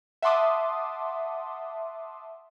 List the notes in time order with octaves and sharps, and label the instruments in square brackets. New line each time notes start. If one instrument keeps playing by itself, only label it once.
[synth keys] E5 F#5 A5 C6 D6 D#6